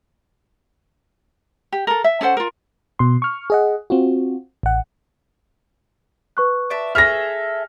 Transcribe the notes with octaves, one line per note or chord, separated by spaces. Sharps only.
G4
A4 A#4
E5
C#4 A4 C5 F#5
F4 A#4
B2 C6
C#6 F6
G#4 D#5 F#5
C4 F4 F#4
A1 F#5
B4 C#6 F#6
D5 E5 A5
G#4 A4 E5 F6 A#6